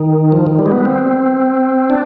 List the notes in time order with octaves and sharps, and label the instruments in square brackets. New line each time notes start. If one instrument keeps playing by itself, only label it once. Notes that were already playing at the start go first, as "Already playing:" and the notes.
Already playing: [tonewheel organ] D#3
F3
D#3
G3
G#3
B3
C4
D4